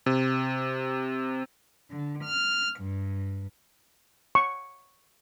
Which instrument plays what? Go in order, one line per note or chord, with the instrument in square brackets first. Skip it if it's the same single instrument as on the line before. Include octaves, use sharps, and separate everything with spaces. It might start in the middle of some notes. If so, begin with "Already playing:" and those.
[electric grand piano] C3
[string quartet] D3
F6
G2
[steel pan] C#6